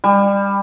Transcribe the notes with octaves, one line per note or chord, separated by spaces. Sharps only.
G3